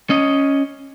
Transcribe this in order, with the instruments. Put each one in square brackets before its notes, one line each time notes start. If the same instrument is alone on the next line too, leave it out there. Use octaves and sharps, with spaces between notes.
[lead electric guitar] C#4 D#5